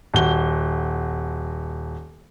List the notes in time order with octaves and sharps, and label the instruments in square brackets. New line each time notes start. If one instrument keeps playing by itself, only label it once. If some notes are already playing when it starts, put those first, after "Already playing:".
[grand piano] D#1 F#4 G7